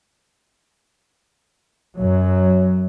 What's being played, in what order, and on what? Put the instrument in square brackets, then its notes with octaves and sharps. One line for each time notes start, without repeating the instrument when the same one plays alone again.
[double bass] F#2 F#3